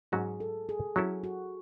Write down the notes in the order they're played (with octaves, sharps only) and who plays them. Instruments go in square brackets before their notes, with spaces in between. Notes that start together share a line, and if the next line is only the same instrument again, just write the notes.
[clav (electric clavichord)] G#2 F#3 C#4 F#4 [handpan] G#4
[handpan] A4
G#4
[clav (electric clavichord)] F#3 C#4 E4 A4 [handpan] F#4
[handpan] F#4